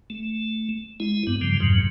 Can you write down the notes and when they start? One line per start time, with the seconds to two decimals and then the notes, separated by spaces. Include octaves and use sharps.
0.10 A3
1.00 G#3 E4
1.27 G2 B3
1.41 G2 C#3 F3 G3
1.60 F2 G#2 C3 F#3